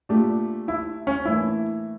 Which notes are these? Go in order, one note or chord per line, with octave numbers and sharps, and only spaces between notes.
A#2 A3 D4 G4
E4
C#4
A2 E3 A#3 D4 E4